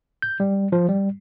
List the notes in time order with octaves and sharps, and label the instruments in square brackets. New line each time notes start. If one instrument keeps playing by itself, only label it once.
[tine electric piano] G6
G3
F3
G3